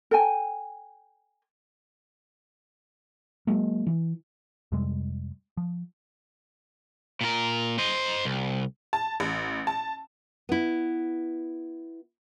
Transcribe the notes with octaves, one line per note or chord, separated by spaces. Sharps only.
A4 G5 G#5
F#3 G#3 A#3
E3
F2 C3 G3 G#3
F3
A#2 A#4
C5 D#5
C2
A5
A1
A5
B3 E4